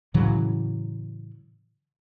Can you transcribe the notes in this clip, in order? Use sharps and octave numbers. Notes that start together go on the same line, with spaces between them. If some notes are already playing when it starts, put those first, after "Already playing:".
A2 C#3 E3 F#3